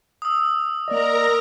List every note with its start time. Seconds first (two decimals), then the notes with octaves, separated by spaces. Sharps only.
0.22 D#6 E6
0.88 A#3 A#4 D5 D#5 A#5